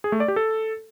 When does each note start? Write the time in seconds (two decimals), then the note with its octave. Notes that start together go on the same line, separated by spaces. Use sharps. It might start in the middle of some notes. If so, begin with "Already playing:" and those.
0.04 G#4
0.12 A3
0.20 D5
0.28 G4
0.36 A4